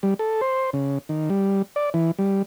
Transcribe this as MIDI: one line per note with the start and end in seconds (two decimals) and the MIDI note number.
0.03 0.14 55
0.19 0.41 69
0.41 0.70 72
0.73 0.98 49
1.09 1.29 51
1.30 1.62 55
1.76 1.90 74
1.94 2.11 52
2.19 2.42 55